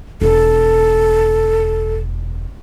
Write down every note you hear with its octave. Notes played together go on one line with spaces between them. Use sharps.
E1 A4